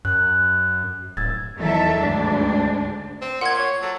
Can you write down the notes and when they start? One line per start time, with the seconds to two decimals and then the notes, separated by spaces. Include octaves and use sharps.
0.05 F#2 F#6
1.17 D1 E6 G#6 A6
1.57 E2 D#3 F#3 A4 E5
1.99 D2 G#2 D4
3.22 C4
3.41 A#2 F#5 C6 G#6
3.58 C#5
3.82 F#3 A4